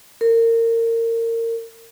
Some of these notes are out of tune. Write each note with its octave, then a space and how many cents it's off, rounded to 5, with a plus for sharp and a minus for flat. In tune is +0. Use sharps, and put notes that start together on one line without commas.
A#4 -30